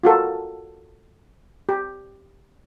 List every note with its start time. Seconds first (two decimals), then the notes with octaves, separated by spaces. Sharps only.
0.03 F4 F#4 A4 A#4
1.69 G4